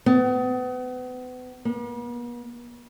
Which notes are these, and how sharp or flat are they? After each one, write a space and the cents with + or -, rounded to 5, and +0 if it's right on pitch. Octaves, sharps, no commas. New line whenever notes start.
B3 +35
B3 -45